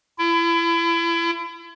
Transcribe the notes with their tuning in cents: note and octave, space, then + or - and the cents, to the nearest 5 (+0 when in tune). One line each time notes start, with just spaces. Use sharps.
E4 +35